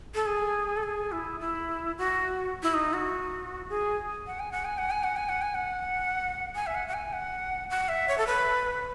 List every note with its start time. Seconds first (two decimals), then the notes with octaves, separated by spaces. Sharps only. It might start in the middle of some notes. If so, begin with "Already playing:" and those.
0.15 A4
0.26 G#4
0.77 A4
0.83 G#4
1.12 E4
1.40 E4
1.98 F#4
2.63 E4
2.74 D#4
2.93 F#4
3.70 G#4
4.27 F#5
4.40 G#5
4.52 F#5
4.65 G#5
4.78 F#5
4.91 G#5
5.04 F#5
5.16 G#5
5.29 F#5
5.42 G#5
5.55 F#5
6.55 G#5
6.67 E5
6.75 F#5
6.88 F#5
6.94 G#5
7.13 F#5
7.70 F#5
7.89 E5
8.08 C#5
8.18 A4
8.27 B4